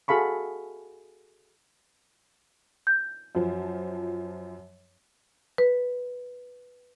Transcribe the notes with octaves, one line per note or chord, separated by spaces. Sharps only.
F#4 G#4 A4 F5 B5 C#6
G6
F#2 F3
B4